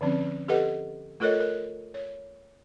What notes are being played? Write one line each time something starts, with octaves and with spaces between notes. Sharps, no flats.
D3 F3 C4 C#4
G4 A4 B4 D#5 F#5
A3 F4 A4 A#4 C#5 D#5
A#4
C#5